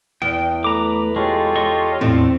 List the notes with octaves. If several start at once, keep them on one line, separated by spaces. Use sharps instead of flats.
E2 G5
A3 B4 A#5 D6
G#3 F4 G4 A4 C#5
D#5 C6 C#6
E2 A2 C4